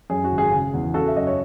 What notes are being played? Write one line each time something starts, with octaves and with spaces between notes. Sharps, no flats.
F#2 G#4
F#4
G#1
G#4
C#3
E2
C#3 F#4 A4
E5
F#2 D#5
C#5